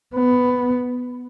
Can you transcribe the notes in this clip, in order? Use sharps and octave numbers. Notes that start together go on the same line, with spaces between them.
B3